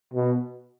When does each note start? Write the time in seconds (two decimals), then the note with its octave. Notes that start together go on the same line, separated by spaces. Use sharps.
0.14 B2